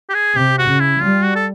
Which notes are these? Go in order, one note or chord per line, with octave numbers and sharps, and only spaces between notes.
G4
G#4
C3 G4
F#4
C#3
E4
G3 F4
F#4
A4